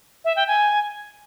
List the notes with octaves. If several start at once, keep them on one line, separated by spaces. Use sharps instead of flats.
E5
G5
G#5